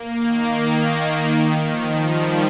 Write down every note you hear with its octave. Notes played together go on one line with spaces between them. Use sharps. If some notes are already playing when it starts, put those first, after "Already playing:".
Already playing: A#3
D#3
D#3
F3
G3